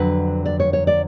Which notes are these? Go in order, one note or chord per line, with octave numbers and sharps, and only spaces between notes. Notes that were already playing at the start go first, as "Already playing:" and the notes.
Already playing: F2 D3 F#3 B4
D5
C#5
C#5
D5